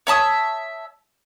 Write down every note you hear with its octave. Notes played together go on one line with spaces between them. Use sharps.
C#5 E5 A5 D#6